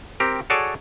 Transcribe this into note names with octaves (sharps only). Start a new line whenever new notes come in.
C4 G4 A#4
F#4 G#4 A4 C#5 D5